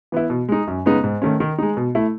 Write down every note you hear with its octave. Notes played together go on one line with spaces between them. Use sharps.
E3 B3 E4
B2
G#3 D#4
F#2
C#3 G#3 B3 D#4
G#2
D#3 A3 C#4
D#3
G#3 D#4
B2
A3 E4